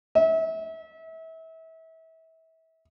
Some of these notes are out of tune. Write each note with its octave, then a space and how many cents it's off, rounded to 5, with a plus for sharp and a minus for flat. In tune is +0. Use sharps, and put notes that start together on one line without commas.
E5 -30